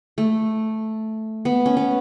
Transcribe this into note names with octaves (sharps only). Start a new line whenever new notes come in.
A3
B3
C#4
B3